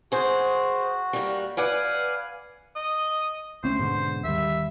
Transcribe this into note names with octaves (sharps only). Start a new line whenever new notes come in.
F#4 G#4 C5
G3 A#3
B4 D5 F5 F#5 G#5
D#5
D2 C4 C#4 C5
G#2 B2 D3
D#2 G3 E5